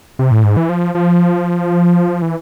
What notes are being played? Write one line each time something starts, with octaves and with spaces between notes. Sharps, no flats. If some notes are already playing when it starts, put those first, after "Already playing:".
C3
A2
G#2
E3
F3
F3
E3